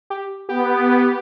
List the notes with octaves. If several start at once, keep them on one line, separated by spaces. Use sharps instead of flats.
G4
B3 G4